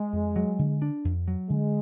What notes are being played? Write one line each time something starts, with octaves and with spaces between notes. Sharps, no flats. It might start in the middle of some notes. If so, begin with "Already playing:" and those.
Already playing: G#3
F2
F#3
D3
D4
F2
F#3
D3 G#3